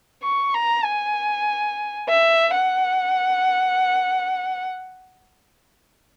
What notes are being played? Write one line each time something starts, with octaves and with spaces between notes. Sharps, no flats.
C#6
A#5
G#5
E5
F#5